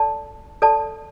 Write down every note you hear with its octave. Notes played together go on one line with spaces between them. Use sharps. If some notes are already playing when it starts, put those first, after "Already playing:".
Already playing: A4 D5 A5
A4 D5 A5